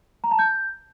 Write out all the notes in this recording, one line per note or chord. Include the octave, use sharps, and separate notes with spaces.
A#5
A5
G6